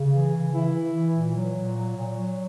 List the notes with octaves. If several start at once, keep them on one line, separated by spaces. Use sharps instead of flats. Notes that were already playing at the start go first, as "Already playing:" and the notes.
Already playing: C#3
E3
C#3
E3 E4
E3
E3
A#2
F#3
A#2
F#3
A#2
F#3